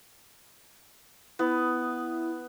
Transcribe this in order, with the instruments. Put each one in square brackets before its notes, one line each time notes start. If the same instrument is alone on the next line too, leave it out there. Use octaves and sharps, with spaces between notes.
[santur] B3 [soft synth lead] E4